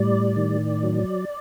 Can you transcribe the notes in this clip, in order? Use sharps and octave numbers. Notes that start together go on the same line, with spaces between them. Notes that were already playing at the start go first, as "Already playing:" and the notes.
Already playing: A2 G3 D5
D#3
F#3